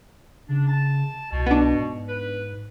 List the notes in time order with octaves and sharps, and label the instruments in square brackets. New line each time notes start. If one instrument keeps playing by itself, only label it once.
[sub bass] C#3 [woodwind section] D4
[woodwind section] A5
[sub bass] C2 [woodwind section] B2
[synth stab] B3 D4
[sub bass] G#2
[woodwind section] B4